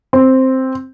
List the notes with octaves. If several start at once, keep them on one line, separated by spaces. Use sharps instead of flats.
C4